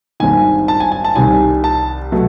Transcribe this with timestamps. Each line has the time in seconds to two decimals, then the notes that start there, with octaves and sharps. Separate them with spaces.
0.20 G#1 G2 D#3 G#5
0.68 A5
0.80 G#5
0.92 G#5
1.04 A5
1.16 C2 C3 D#3 G3 G#5
1.64 A5
2.12 B2 F#3 A3